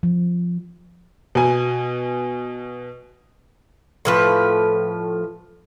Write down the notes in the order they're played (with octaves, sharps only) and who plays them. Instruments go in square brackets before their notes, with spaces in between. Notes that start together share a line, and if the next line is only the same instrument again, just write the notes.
[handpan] F3
[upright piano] B2 G#5
[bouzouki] A2 F3 B4